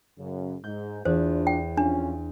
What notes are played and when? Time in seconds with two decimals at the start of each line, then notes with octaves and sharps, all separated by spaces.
0.18 F#2 C#3
0.64 G#2 G6
1.05 E2 D4 F4 C5
1.47 G5
1.77 F2 C#4 D4 F4